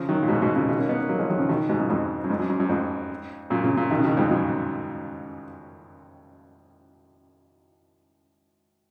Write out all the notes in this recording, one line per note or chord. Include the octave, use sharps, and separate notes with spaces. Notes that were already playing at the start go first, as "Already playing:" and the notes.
Already playing: C#3 F3
D#3 F#3
A#2
G#2 B2
G#2 B2
A#2 C#3
B2 D#3
A#3 C#4
B3 D#4
A#3 C#4
F#3 A#3
F3 G#3
D#3 F#3
C#3 F3
B2 D#3
G#2 B2
F#2 A#2
F2 G#2
F#2
F2 G#2
F#2
F#2
F#2
F2 G#2
F#2 A#2
A#2 C#3
A#2 C#3
B2 D#3
C#3
B2 D#3
F2 G#2
F#2 A#2